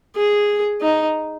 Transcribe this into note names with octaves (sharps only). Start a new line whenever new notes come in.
G#4
D#4